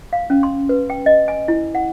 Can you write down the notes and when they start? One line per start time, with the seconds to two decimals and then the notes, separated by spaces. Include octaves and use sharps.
0.13 F5
0.30 C#4
0.43 C6
0.69 B4
0.90 G5
1.06 D#5
1.28 G#5
1.48 E4
1.75 F#5